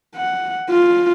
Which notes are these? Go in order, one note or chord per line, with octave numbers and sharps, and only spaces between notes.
F#5
F4